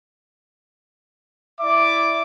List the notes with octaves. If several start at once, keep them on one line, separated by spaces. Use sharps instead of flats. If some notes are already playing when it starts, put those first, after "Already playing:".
E4 D5 E5 D6